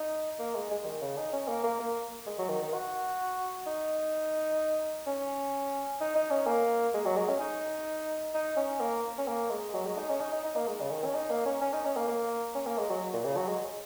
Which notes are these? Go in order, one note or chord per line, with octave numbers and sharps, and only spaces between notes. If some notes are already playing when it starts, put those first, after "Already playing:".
Already playing: D#4
A#3
G#3
G#3
D#3
C#3
D#4
C#4
A#3
A#3
A#3
G#3
F#3
D#3
D#3
F#4
D#4
C#4
D#4
D#4
C#4
A#3
G#3
F#3
G#3
C#4
D#4
D#4
C#4
A#3
C#4
A#3
G#3
F#3
G#3
D#4
C#4
D#4
D#4
D#4
A#3
G#3
C#3
D#3
C#4
D#4
A#3
C#4
C#4
D#4
C#4
A#3
A#3
C#4
A#3
G#3
F#3
A#2
C#3
F#3
G#3